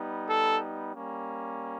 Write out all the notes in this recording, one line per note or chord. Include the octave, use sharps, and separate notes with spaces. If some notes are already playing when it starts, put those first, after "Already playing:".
Already playing: G3 B3 D#4
A4
G3 A#3 C#4